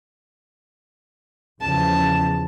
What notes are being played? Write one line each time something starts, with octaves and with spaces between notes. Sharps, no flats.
E2 C#3 F3 A5